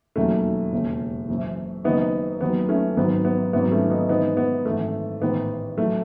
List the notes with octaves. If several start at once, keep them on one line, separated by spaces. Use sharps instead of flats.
E1 D#2 D#3 F#3 A3 C#4
E1 D#2 C#3
F#1 F#2 E3
F#1 F#2 D#3 B3 D#4
D#2 D#3 F#3 B3
A3 C#4
G#1 G#2 D#3 F#3 B3
B3
G#1 G#2 D#3 F#3 B3
A3 C#4
B3 D#4
G#1 G#2 E3 B3 D#4
B3
G#1 F#2 E3 A3
A1 G#2 D#3 B3
A2 F#3 A3